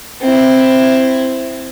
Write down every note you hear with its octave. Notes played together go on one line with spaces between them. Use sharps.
C4 E4